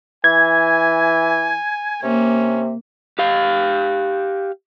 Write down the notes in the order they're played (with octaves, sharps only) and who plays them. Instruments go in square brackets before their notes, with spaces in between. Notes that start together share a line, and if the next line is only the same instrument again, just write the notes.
[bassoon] E3 [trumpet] G#5 [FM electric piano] G#6
[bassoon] C3 [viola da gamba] A#3 [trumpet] C#4
[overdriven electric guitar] G4 F5